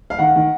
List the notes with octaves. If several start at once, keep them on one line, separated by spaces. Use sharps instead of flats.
F5
D#3 F#5
D#3